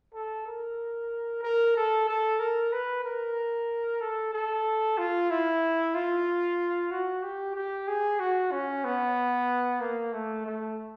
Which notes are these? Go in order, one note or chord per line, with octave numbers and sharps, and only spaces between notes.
A4
A#4
A#4
A4
A4
A#4
B4
A#4
A4
A4
F4
E4
F4
F#4
G4
G4
G#4
F#4
C#4
B3
A#3
A3
A3